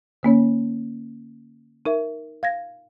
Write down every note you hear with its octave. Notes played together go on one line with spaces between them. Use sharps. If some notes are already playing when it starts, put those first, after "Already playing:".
D3 A#3 C#4 C#5
D#4 A#4 E5
F5 G#6 A#6